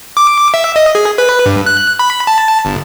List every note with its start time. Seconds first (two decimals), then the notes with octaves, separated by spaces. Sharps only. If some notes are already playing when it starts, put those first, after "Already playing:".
0.17 D6
0.54 E5
0.76 D#5
0.95 G#4
1.18 B4
1.46 G2
1.66 F#6
1.99 B5
2.27 A5
2.65 G1